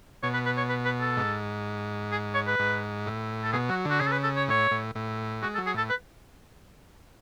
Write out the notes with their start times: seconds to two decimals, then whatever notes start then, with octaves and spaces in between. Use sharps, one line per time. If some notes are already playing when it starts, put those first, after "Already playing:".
0.23 B2 C#5
0.34 B4
0.46 B4
0.57 C#5
0.69 B4
0.85 B4
1.01 A4
1.17 G#2
2.12 G#4
2.35 C#5
2.47 B4
2.59 G#2
3.07 A2
3.44 A4
3.53 B2 G#4
3.69 F#3 F#4
3.85 D3 F#4
4.00 C#3 G#4
4.07 A4
4.12 B4
4.24 A4
4.36 C#5
4.48 A2 C#5
4.71 A2
4.95 A2
5.42 G#3 F#4
5.55 A4
5.58 F#3
5.66 G#4
5.74 A2 A4
5.90 B4